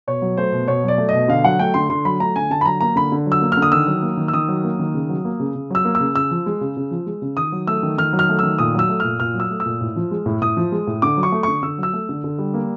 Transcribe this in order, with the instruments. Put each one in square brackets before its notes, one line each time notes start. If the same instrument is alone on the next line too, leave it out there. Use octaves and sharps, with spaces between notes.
[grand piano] B2 C#5
F#3
A3 C5
B2
B2 C#5
F#3 D5
A3
B2 D#5
D3 F5
F#3 F#5
A3 G5
D3 C6
D3 C6
F#3 B5
A3 A#5
D3 G#5
D3 A5
B5
F#3 A#5
A#3 A#5
D3 B5
D3
F#3
E6
A#3
F6
D3
D#6
D#3 E6
F#3
A#3
D#3
E6
D#3 D#6
F#3
A#3
D#3
C#3
F#3
A#3
C#3
C#3
F#3 E6
A#3
C#3 E6
C#3 E6
F3
G#3
C#3
C#3
F3
G#3
C#3
D#3 D#6
F#3
A3 E6
D#3
D#3 F6
F#3
F6
A3
D#3 E6
A#2 D#6
F#3 E6
A3
A#2 F6
A#2 F6
F#3
E6
A3
E6
A#2
A2
F3
G#3
A2
A2 D#6
F3
G#3
A2
D3 D6
F#3
C#6
A3
D3 C#6
D3 E6
F#3 E6
A3
D3
D3
G3
A#3